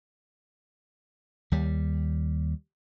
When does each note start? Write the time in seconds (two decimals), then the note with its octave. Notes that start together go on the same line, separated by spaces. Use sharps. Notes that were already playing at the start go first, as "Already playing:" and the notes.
1.52 D#2 G3